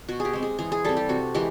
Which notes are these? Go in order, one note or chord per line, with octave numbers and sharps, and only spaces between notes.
B2 F#4
G#4
G4
G#3 C4
G#4
E3 G#4
G#4
G3 C4 A4
G4
C3 F#4
E3 G#3 G4